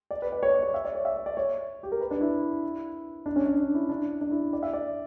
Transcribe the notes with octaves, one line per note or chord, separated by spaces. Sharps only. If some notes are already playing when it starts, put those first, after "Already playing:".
D5
B4
D5
C#5
D5
C#5
E5
D5
C#5
E5
D5
D5
C#5
G4
A#4
B4
D4
E4
D4
C#4
D4
D4
E4
D4
D4
E4
D5
E5
D5